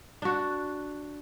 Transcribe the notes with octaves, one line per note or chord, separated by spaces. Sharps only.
D4 F#4